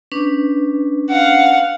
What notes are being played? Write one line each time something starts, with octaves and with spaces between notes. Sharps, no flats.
C#4 D4 B4
F5 F#5